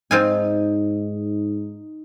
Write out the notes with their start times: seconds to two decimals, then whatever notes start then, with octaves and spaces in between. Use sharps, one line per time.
0.11 G#2 C4 D#4 F4 G#5